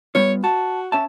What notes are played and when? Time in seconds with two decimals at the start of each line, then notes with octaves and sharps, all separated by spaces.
0.15 G3 B3 F4 C#5
0.44 F#4 A5
0.92 C#4 E5 A5